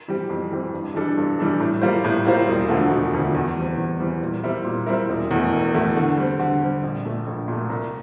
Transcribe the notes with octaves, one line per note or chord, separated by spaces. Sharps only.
E3 G3 C4 G4
F2
E3 G3 C4 G4
G2
E3 G3 D4 A4
G2
E3 G3 D4 A4
A2
G3 A#3 F4 C5
A2
G3 A#3 F4 C5
E1
D2 D3 F3 A3
E1
D2 D3 F3 A3
E2
E3 G3 C4
E2
E3 G3 C4
A#2
G3 C4 E4 A#4
A#2
G3 C4 E4 A#4
E1
E2 E3 A3
E1
E2 E3 A3
D3
G3 C4
D3
G3 C4
A#1
A#2 A3
A#1
A#2 A3
C2